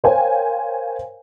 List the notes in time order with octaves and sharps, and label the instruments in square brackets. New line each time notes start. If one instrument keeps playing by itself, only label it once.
[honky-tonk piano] A#4 C5 C#5 F5 G5 G#5